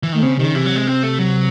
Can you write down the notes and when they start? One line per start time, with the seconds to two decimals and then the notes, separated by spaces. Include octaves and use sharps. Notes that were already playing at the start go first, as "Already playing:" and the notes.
0.03 E3
0.12 D#3 A3
0.22 C#3 C4
0.37 C3 D#3
0.44 C#3
0.55 C3 E3
0.66 F#3
0.76 G#3
0.87 C4
1.03 A3
1.19 F#3